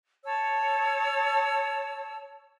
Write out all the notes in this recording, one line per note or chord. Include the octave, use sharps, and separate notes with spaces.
C#5 A5 E6